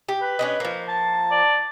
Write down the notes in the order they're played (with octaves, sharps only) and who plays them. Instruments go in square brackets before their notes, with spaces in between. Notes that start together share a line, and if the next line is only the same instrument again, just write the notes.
[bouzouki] G4
[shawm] B4
[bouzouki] C#4 D4 D#5
F3 A#3
[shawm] A5
[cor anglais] D5